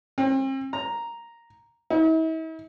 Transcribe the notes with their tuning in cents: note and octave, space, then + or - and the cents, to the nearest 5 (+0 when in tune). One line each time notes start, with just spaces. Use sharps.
C4 +40
A#5 +0
E4 -45